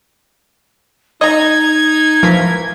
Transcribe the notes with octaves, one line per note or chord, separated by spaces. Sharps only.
D#4 D#5 A#5 G#6
E3 F3 A#4 B6